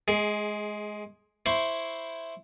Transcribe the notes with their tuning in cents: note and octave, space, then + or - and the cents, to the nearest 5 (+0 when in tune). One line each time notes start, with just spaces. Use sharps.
G#3 +20 G#4 +0
E4 +0 C5 +0 C#6 +10